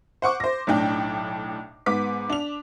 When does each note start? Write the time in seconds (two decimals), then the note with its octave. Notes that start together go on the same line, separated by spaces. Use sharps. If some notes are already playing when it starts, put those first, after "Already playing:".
0.22 C5 F#5 C#6 D6
0.40 C5 A#6
0.67 B1 A2 D4 G5
1.86 G#2 B3 D6 B6
2.30 D4 F7